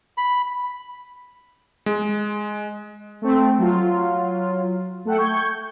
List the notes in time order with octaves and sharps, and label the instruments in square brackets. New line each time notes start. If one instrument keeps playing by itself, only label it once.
[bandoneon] B5
[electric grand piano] G#3
[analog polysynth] A3 C4
F#3 F4
A3 A4 F#5 G5
C#6 G6 G#6